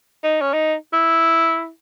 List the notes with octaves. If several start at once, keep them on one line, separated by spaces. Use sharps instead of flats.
D#4
C#4
D#4
E4